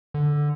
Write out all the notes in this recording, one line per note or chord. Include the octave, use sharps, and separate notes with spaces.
D3